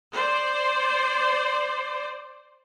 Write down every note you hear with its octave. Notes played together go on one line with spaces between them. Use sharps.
C5 D5